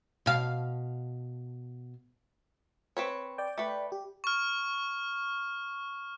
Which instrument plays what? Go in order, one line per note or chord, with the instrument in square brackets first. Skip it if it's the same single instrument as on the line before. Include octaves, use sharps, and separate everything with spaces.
[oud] B2 F5
[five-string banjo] C4 B4 C#5
[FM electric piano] D5 G5
[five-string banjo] A3 B4
[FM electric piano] G4
[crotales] C#6 F6